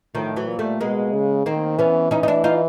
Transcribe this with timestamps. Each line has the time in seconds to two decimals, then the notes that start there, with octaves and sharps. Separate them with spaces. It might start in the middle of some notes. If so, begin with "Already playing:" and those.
0.15 A2 D#3 F3
0.36 E3 F#3
0.47 A#2
0.59 G3 A3
0.81 B2 G#3 A#3
1.13 C#3
1.46 D#3 A#3 C4
1.78 E3 B3 C#4
2.11 E3 C#4 D#4
2.23 D#4
2.28 D4 E4
2.44 D#4 F4